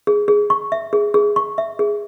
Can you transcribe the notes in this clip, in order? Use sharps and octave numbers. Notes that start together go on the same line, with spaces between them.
G#4
G#4
C#6
E5
G#4
G#4
C#6
E5
G#4